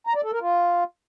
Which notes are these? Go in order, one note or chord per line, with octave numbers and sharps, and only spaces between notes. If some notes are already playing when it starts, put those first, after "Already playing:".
A#5
D5
A4
A#4
F4